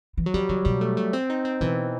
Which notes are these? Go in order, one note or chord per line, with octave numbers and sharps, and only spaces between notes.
E3
F#3
E3 G3
D#3 F#3
B2 G3
A3
A3
C4
D#4
C4
B2 E3